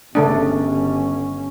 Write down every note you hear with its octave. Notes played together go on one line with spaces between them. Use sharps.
G1 C#3 A3 C#4 D4